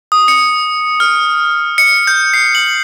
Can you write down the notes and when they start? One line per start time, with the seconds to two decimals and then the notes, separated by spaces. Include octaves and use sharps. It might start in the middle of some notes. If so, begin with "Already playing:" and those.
0.12 D#6
0.28 C#7
1.00 F6
1.78 C#7
2.07 G6
2.34 C7
2.55 F#7